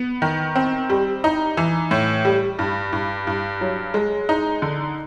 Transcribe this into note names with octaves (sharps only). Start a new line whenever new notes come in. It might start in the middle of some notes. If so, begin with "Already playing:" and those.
Already playing: B3
D#3
C4
G3
D#4
E3
A2
G3
G2
G2
G2
F#3
G#3
D#4
D3